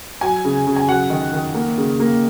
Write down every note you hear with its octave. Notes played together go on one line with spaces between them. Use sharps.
F#3 G#5
C#3
C#3
G#5
F#3 F#5
D#3
D#3
A#3
C#3
A#3